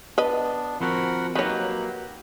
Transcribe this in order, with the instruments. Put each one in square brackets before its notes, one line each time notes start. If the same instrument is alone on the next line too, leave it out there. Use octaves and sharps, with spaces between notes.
[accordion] B3 D4 [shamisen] B4 D#5
[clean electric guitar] F3 C4 F#4 [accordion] A#4 F#5 B5
[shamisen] D#3 C#5 [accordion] F#3 A#3 [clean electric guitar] F#4 G4 B4